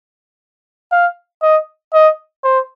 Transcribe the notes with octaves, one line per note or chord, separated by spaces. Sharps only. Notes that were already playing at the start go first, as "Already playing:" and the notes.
F5
D#5
D#5
C5